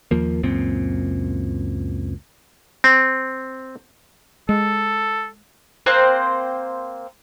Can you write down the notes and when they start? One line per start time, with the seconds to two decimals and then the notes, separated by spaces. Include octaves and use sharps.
0.11 D#2 F3 A#3
0.43 C#2 F#2 A#2 C4
2.84 C4
4.49 G#3 A4
5.86 A#3 C4 C5 F#6